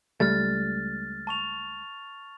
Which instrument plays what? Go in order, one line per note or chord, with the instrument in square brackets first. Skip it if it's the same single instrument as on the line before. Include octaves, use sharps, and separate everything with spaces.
[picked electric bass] C#2 G3 A3 [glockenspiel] F6 A6
[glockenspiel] A5 C#6 F7